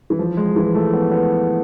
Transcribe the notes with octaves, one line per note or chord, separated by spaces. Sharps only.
E3
F3
G#3
E3
A3
B3
B3